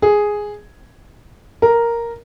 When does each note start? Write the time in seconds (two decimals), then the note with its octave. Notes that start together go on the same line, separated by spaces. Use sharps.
0.02 G#4
1.62 A#4